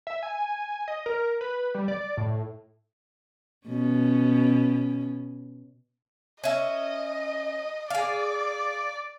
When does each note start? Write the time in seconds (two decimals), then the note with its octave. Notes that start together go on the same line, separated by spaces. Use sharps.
0.07 E5
0.23 G#5
0.88 D#5
1.06 A#4
1.41 B4
1.75 G3
1.88 D5
2.17 A2
3.67 B2 C#4
6.44 C#4 D#5 E5
7.90 G#4 D5 F5